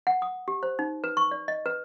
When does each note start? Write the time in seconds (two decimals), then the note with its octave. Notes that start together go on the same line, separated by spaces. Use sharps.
0.07 F#5
0.22 D#6
0.48 G4
0.63 C5
0.79 D#4
1.04 B4
1.17 C#6
1.31 D5
1.48 D#5
1.66 B4